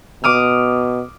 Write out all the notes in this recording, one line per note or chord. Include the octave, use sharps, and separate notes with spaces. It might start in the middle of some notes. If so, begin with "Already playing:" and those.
B2 D6 D#6 F6